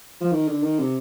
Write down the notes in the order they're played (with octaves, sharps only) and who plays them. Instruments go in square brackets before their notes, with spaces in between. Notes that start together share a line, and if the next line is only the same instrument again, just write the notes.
[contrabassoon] F3
D#3
D3
D#3
C3